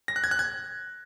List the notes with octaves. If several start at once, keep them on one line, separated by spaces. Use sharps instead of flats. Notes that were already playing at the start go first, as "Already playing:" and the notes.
A#6
F#6
G#6
F#6
G#6